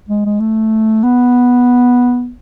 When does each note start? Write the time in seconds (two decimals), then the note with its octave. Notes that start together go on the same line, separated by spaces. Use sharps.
0.09 G#3
0.25 G#3
0.40 A3
1.03 B3